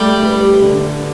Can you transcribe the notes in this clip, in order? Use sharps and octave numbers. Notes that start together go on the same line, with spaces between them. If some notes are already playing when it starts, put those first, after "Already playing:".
Already playing: G3 A3
B4
D3